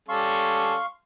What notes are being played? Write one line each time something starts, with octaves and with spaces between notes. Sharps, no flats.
G3 C#4 A4 F5 C6 C#6